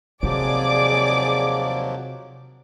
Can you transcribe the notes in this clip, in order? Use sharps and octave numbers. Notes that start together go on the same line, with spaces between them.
D#2 C3 F3 F#3 G#4 D5 D6